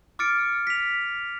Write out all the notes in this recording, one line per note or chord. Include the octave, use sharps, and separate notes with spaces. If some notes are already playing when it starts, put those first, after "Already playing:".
D6 F6 A6 C#7 D7
B6 F7